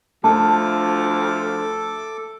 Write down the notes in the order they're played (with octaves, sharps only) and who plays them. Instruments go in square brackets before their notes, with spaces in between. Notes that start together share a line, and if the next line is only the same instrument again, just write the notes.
[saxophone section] D2 F3 [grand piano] A3 [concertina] A4 D6 [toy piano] A5